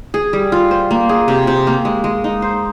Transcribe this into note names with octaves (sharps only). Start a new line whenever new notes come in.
G#4
G3
F4
C5
A#3
G#4
C3
C3
A#3
G#3
G#3
D#4
C5